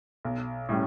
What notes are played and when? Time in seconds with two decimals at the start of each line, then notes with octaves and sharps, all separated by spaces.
0.25 B1
0.69 A2 G3 C#4